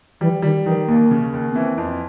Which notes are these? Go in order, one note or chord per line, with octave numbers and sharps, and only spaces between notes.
E3 G3
D#3 G3
D#3 E3
D#2 A#3
C#3
D#2
B3
E3 C4
F2